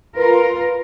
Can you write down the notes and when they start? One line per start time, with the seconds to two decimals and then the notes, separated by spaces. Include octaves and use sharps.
0.17 F4 A#4 B4